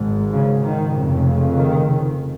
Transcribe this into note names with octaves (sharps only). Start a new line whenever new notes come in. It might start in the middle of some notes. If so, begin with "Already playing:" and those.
Already playing: G#1 G#2
C#3
D#3
F1 F2 C#3
D#3